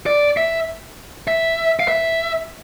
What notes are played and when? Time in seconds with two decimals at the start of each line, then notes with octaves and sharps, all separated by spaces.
0.06 D5
0.37 E5
1.28 E5
1.80 F5
1.88 E5